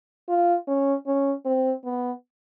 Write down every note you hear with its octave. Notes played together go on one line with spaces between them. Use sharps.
F4
C#4
C#4
C4
B3